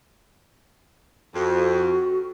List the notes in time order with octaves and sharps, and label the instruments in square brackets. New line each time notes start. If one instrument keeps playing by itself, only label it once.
[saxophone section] F2 [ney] F#4